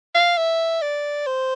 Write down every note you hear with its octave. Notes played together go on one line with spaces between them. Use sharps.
F5
E5
D5
C5